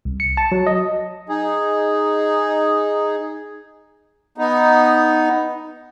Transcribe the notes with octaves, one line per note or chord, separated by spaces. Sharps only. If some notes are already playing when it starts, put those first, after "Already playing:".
C2
C#7
A5
F#3
D#5
D#4 G#4
B3 D#4